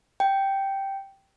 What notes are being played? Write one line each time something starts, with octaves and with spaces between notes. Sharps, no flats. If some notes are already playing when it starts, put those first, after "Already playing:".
G5